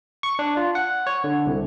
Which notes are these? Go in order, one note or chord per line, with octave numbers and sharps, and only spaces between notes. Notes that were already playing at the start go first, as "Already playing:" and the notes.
C#6
D4
F4
F#5
C#5
D3
C2